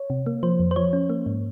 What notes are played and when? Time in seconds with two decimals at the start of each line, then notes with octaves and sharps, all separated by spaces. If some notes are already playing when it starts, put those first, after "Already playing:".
Already playing: C#5
0.10 C3
0.26 A#3
0.43 F3 C5
0.59 F2
0.71 C5
0.76 F3 C#5
0.93 C#4
1.10 A#3
1.26 G#2